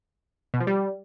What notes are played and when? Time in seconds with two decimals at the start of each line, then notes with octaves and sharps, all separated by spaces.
0.54 B2
0.60 F3
0.67 G3